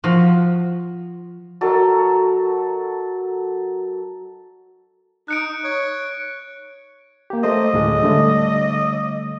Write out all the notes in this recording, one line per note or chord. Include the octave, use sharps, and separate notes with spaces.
F3 F#4
F#3 D#4 A4 A#4
D#4 F#6 C#7 D7
C#5
A#3 G4
A3 C5 D#5
D2 A2 G#3
D3 G3 A3